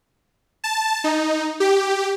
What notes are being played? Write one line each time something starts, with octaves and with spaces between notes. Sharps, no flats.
A5
D#4
G4